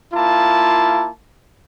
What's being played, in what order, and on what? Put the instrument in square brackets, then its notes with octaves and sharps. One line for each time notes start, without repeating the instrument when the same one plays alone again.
[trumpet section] A#3 E4 F4 A5